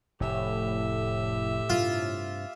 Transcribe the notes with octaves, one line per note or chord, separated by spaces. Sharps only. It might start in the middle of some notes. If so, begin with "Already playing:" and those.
F1 A2 G4 E5
G2 C3 F4